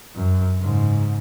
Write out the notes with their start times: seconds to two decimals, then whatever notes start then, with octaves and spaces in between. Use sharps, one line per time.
0.15 F#2
0.58 G#2 C#3